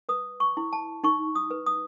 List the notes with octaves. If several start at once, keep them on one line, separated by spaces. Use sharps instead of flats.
B4 D#6
C#6
E4
A5
D#4 C#6
D#6
B4
D#6